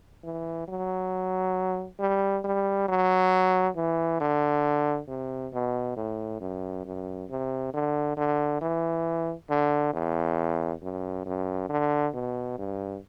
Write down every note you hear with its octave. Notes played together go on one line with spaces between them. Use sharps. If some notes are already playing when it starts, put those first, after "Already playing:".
E3
F#3
G3
G3
F#3
E3
D3
C3
B2
A2
F#2
F#2
C3
D3
D3
E3
D3
E2
F#2
F#2
D3
B2
G2